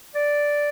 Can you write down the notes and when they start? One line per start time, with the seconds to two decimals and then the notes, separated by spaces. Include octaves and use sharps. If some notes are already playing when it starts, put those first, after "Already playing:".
0.15 D5